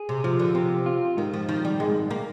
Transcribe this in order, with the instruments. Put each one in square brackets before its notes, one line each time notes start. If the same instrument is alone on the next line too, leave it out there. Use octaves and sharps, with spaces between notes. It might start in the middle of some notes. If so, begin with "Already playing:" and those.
Already playing: [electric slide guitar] G#4
[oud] C3
[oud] C3 [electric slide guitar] F3
[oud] D3
[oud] C3 [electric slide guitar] C4
[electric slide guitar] F4
[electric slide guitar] G#2 [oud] D#3
[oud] F3
[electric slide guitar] D#3 [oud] F3
[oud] G3
[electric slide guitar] G#2 [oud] G#3
[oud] A#3